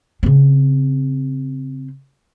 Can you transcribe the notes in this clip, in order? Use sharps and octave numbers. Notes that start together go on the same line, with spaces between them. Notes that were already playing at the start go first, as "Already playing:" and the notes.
C#3 C4